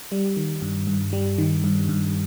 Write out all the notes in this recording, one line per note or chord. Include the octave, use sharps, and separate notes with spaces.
G3
D#3
G2
G2
G3
D#3
G2
G2